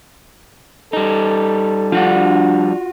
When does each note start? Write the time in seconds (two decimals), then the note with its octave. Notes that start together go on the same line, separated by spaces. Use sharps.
0.93 G3 D#4 A4
1.92 F3 G3 D4 F4 F#4